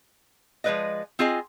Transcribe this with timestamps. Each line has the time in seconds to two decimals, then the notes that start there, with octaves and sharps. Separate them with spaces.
0.64 F3 G#3 C4 B4 D5 D#5
1.19 C4 F4 G#4 D#5 G#5